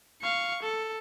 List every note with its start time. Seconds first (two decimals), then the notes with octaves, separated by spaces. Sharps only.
0.22 F5 C#6
0.63 A4